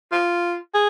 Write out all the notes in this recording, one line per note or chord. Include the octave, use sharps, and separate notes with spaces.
F4
G#4